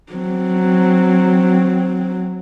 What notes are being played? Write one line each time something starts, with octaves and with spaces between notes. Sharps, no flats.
F#3 C4